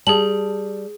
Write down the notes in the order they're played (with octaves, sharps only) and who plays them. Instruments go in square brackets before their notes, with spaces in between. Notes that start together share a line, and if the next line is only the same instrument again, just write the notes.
[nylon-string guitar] G3 A5 [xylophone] G#4 F#7